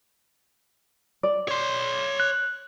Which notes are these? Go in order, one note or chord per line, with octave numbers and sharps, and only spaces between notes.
D5
C#5 C6
F#6